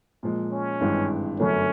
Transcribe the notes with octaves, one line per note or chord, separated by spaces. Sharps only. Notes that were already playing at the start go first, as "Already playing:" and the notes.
A#2 F3 G#3
C#4
G#1 G2 E3 G#3
G1 F#2 D3 F#3 A3 C#4